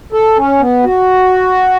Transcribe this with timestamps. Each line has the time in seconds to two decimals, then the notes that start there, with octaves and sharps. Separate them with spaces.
0.13 A4
0.37 C#4
0.60 B3
0.84 F#4